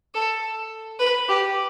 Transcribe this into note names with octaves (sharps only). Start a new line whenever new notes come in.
A4
B4
G4